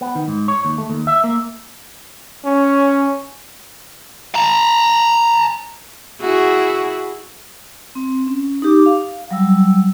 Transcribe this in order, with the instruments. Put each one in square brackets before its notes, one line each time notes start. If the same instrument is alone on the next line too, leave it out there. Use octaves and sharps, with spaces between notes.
[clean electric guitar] B3
D#3
G#2
C#5
D#2
A3
D#2
E5
A#3
[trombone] C#4
[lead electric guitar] A5 A#5
[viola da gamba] E4 F#4 G#4
[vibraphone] C4
C#4
D#4 G4 D6
F5
F#3 G3 E6